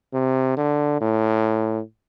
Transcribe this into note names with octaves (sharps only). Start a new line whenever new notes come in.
C3
D3
A2